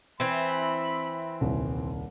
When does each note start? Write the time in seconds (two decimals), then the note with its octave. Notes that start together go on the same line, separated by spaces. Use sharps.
0.20 E3 C4 E5 B5
1.41 D#1 C2